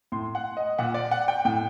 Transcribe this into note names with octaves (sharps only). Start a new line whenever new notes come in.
A2 C6
F#5
D#5
A#2 F#5
D5
F#5
G5
A2 G5